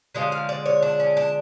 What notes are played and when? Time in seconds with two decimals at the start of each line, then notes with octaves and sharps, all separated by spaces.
0.15 D3 F3 G#3 C#4 F5
0.32 F5
0.49 D5
0.66 C#5
0.82 D4
1.00 C#4
1.17 D4